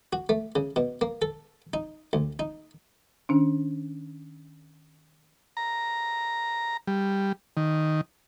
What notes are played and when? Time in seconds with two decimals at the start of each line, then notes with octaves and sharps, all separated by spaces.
0.13 F#4
0.29 A3
0.56 C#3
0.76 B2
1.01 A#3
1.22 A4
1.73 D#4
2.13 D2
2.39 D#4
3.29 D#3 C#4 D4
5.57 A#5
6.87 G3
7.57 D#3